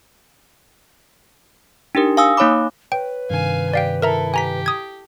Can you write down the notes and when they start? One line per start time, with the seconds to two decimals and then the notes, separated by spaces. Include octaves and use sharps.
1.95 D4 D#4 G4 A#4
2.17 F5 G#5 D#6 E6
2.37 A#3 D#4 C#5 F5 B5 D6
2.92 B4 C#5 G5
3.30 G2 C3 D#3 F5 G#5
3.74 G4 D5 F5 G5
4.02 E4 A4 A#4 E5 A#5
4.34 G4 G#5 A#5 B6
4.66 D#6 G#6